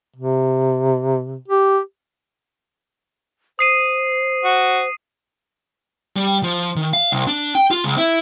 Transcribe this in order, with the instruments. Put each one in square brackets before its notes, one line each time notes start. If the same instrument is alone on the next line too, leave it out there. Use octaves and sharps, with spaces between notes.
[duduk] C3
G4
[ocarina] C5 [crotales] D#6 C7 D#7
[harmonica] F#4
[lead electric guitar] G3
F3
D#3
F5
C2
D4
G5
F4
C#2
E4